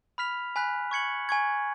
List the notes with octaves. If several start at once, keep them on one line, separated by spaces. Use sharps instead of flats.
B5 F6 B6 F7
G#5 B5 F#6 B6
C#6 G#6 C#7 F#7
G#5 C#6 G#6